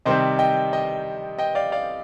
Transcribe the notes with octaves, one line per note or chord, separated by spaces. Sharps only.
C3 D#3 G3 C4 C5 D#5
D#5 G5
D#5 G5
D#5 G5
D5 F5
D5 F5